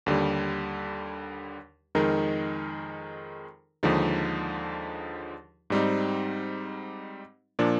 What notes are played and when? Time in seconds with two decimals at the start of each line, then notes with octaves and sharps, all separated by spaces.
0.06 D#2 D3 G3
1.95 F2 D#3 G#3 D#4 A#4
3.83 D#2 D3 F3 G#3 D#4
5.70 G#2 G3 C4 D#4
7.59 A#2 F3 A#3 D4